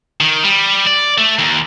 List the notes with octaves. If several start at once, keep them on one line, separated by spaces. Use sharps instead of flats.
D#3
G3
D5
A3
D#2